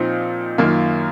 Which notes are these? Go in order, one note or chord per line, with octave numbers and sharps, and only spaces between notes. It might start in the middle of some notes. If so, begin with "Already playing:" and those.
Already playing: A#2 F3 C4 D#4
F#2 D#3 A#3 F4